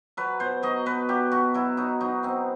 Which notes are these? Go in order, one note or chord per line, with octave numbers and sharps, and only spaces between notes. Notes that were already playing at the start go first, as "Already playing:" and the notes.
F#3 B4
B2 C5
F#3 D#5
B2 B4
F#3 G4
B2 F#4
F#3 E4
F#3 D#4
F#3 D#4
B3 C4